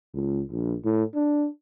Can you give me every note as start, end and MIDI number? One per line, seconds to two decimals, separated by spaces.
0.14 0.43 37
0.50 0.76 34
0.85 1.03 45
1.15 1.47 62